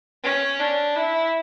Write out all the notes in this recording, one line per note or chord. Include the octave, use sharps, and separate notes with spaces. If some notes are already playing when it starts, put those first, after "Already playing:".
C#4
D4
E4